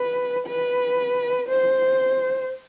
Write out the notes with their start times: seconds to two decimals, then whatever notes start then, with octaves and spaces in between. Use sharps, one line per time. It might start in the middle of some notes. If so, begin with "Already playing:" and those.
Already playing: B4
0.47 B4
1.49 C5